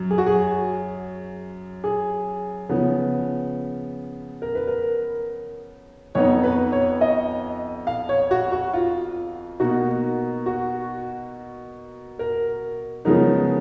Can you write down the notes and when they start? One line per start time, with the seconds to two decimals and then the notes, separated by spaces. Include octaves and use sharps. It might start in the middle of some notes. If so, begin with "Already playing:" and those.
Already playing: F#2
0.11 G#4
0.18 F#4
0.26 G#4
1.84 G#4
2.69 C#3 F3 B3
4.42 A#4
4.55 B4
4.67 A#4
6.15 F2 F3 B3 D#4 C#5
6.43 B4
6.72 C#5
7.01 D#5
7.87 F5
8.09 C#5
8.31 F#4
8.52 F#4
8.73 F4
9.60 B2 A#3 D#4 F#4
10.46 F#4
12.19 A#4
13.05 C#3 F3 G#3 B3 D#4 A#4